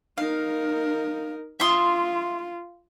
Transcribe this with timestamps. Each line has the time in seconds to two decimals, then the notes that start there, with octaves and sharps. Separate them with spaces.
0.18 D#4 A#4 F5
1.60 F4 E5 C6 D#6